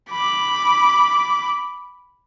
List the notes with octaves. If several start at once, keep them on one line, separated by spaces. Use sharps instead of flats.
B5 D6